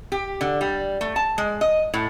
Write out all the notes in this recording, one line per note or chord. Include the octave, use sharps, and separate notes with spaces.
G4
D3
G3
A3
A5
G#3
D#5
A2